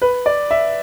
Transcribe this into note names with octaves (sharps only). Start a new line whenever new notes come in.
B4
D5
E5